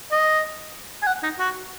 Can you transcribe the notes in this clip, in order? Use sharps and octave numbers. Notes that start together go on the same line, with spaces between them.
D#5
G#5
F#5
D#4
F#4